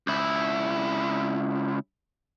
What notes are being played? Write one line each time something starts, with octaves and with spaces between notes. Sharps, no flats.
C#2 E4